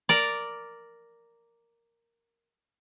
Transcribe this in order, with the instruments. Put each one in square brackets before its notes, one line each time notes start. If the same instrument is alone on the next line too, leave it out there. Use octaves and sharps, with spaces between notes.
[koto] A#4 D5